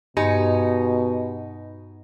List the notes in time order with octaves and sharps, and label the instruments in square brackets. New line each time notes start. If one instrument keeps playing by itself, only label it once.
[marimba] G2 [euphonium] B2 [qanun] D#4 [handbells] G4 D#5 G#5